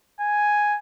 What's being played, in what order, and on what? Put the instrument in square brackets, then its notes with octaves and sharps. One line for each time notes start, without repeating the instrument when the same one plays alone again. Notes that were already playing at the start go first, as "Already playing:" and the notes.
[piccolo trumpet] G#5